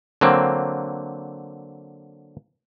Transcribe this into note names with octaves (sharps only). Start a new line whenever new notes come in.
D3 F#3 A#3 C4